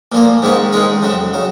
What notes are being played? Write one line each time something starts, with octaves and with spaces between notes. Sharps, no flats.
A#2 F3 A#3
G#2 D#3 G#3 C#4
G#2 D#3 G#3 C#4
F2 C#3 F#3
C#3 F#3